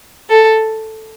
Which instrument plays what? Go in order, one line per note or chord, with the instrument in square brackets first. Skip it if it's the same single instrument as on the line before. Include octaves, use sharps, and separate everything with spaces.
[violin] A4